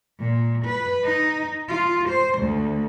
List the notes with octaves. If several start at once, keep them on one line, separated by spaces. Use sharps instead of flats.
A#2
B4
D#4
F4
C5
D2